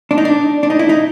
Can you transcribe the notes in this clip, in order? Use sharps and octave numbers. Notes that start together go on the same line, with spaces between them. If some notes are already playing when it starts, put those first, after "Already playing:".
D4
D#4
D4
D4
D#4
E4
D#4